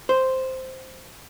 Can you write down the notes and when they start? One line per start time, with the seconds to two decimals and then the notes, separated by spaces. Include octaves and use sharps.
0.09 C5